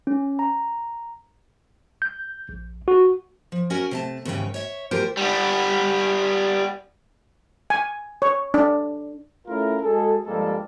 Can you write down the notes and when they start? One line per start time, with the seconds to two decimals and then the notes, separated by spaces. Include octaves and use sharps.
0.07 C#4
0.39 A#5
2.02 G6
2.49 A#1
2.88 F#4
3.52 F3
3.70 C#4 F#4 A#4 F#5 G#5
3.91 C3 A3 A5
4.25 D#2 G#2 C#3 E3 C#5 G5
4.54 C#5 E5
4.91 E3 A3 F4 G4 A#4 C5
5.17 G3 B3
7.70 G#5
8.22 C#5
8.54 D4
9.47 A3 C#4 E4 F4 A#4
9.82 G#3 F#4 G#4 A4
10.26 G2 F3 G3 G#3 A#3 A4